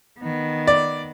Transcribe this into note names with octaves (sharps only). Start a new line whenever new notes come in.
D#3 B3
D5